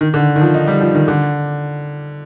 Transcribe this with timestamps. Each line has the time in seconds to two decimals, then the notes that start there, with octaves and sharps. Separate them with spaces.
0.01 D#3
0.14 D3
0.36 D#3
0.41 F3
0.54 D#4
0.67 G3
0.81 F3
0.95 D#3
1.08 D3